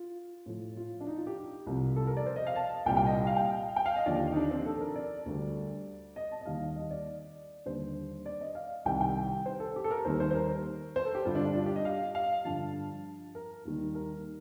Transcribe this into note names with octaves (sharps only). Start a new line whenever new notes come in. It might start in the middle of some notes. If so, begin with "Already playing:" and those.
Already playing: F4
A2 F3
F4
D4
D#4
F4
G4
C2 C3 F3
A4
A#4
D5
C5
D#5
F5
A5
C2 A#2 G3 G5
G5
D#5
F5
G5
G5
F5
D#5
D#2 D3 F3 D5
G4
D#4
D4
C4
A4
A4
A#4
D5
D2 D3 G3
D#5
A5
D#5
D#2 D#3 G3 F5
D#5
D5
D#2 D3 G3 C5
D5
D#5
F5
C2 C3 D#3 G3 G5
G5
C5
A4
G4
A4
A#4
D#2 D#3 G3 C5
C5
C5
A#4
C5
A4
G4
G2 D3 G3 F4
D4
D4
F4
G4
D#5
F5
F5
G2 D3 F3 A5
A#4
D#2 D#3 G3
A#4